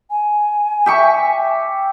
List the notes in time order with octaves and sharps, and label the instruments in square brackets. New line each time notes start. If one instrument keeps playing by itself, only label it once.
[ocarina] G#5
[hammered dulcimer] G4 E5 C#6